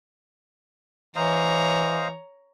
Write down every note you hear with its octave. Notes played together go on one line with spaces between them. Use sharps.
E3 C5 C#5 D#5 F5 A#5